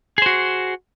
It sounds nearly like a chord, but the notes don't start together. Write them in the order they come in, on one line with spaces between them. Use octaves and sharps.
G#4 C5 F#4